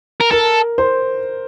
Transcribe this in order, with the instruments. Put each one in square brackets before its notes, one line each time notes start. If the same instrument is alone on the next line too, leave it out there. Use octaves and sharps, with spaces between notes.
[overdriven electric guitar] A#4
[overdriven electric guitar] A4 [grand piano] A#4
[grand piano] C5